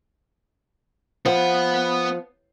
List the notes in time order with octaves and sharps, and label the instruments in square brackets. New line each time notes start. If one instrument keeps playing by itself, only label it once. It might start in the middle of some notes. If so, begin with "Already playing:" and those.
[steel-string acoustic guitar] F3 [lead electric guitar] B3 F#5